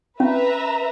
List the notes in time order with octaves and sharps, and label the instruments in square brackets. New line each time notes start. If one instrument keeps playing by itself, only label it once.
[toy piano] C#4 [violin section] B4 E5 A#5